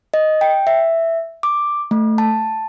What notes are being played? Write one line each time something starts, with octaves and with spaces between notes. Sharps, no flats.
D#5
G5
E5
D6
A3
A5